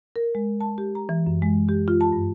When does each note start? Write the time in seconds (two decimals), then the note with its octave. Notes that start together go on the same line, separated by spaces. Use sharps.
0.16 A#4
0.35 G#3
0.61 A5
0.78 G4
0.95 A#5
1.09 E3
1.26 F#2
1.42 G#3
1.69 G4
1.88 F4
2.01 A5
2.12 G2